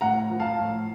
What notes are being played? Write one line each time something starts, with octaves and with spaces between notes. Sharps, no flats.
A2 F#5 A#5
F3
F5 A5
A2